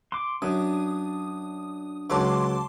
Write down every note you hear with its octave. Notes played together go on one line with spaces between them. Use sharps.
C6 D6
F#2 D4 D#6
C#2 F#3 A5 C6 D6